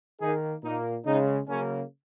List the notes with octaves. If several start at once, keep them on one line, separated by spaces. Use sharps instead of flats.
D#3 A#3 D#4 G#4
A#2 A#3 D#4
C#3 G#3 D#4
C#3 F#3 A#3 C#4